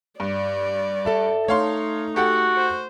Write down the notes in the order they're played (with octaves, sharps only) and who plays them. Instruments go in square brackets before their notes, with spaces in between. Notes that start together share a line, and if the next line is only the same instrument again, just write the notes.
[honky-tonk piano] G2 [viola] D5
[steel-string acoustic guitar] A4 E5 A5
[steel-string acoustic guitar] A3 [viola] D#4 [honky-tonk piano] C#5 F5 C6
[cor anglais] F#4 [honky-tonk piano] G4 A4 F#5
[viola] C5